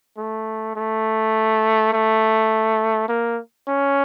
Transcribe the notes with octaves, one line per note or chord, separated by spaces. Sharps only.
A3
A3
A3
A#3
C#4